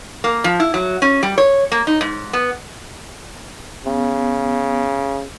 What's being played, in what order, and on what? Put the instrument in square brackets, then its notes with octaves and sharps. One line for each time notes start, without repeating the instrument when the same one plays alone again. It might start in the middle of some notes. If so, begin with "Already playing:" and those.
[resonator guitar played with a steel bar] A#3
F3
E4
F#3
C#4
G3
C#5
A#3
D#4
G#2
B3
[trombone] C#3 [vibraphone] B3